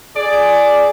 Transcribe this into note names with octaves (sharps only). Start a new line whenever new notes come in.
G#4 D5